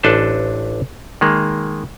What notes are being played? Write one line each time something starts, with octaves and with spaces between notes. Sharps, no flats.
A1 D4 A4 B4 C5 A5
D#3 G#3 A#3